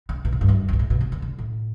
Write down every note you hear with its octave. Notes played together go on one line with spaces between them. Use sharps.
D3
B2
A2
G2
F#2
G2
B2
A2
B2
C3
D3
D3
A2